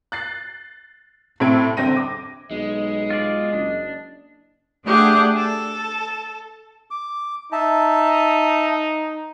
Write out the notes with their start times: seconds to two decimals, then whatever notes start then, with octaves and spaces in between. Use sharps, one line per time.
0.12 F#6 A6 C7
1.40 A2 C3 C4 A4 G#6 D7
1.77 G1 D3 C4 G5 A#6 D#7
1.97 D6
2.51 B1 G#3 D#5
3.10 F4 D5
3.53 F#1 D4
4.84 A3 D4 G4 G#4 F#5
5.36 A4
6.91 D6
7.52 D#4 E5 A5